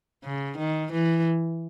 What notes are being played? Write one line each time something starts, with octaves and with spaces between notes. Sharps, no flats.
C#3
D#3
E3